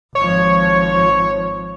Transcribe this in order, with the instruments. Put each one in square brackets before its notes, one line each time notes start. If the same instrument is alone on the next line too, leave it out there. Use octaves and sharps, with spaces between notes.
[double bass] G#1 F3 [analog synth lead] C#5